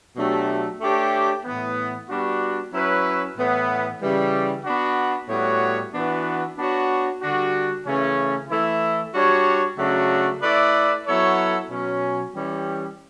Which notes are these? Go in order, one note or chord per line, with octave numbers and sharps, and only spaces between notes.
B2 F#3 A3 D4 G4
A3 D4 G4 C#5
A2 E3 B3
G3 B3 D4 F#4
F#3 C#4 E4 B4
A2 E3 B3
C#3 E3 G3
B3 D4 F#4
A2 G3 B3 F#4 C#5
E3 B3 D4 F#4 B4
B3 D4 F#4 C#5
D3 G3 D4 F#4
C#3 E3 A3 C#4
E3 A3 E4
G3 D4 F#4 C#5
C#3 F#3 A3 D4 F#4
A3 E4 B4 D5
F#3 B3 E4 A4 C#5
B2 F#3 C#4
E3 G3 C#4 G4